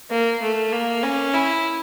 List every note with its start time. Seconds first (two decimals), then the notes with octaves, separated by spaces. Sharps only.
0.10 A#3
0.42 A3
0.72 A#3
1.03 C#4
1.34 E4